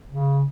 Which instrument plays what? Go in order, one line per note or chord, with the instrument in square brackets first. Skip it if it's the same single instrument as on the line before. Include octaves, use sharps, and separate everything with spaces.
[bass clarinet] C#3